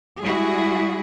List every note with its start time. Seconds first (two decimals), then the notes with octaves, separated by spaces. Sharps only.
0.22 G3 G#3 E4 F#4 G#4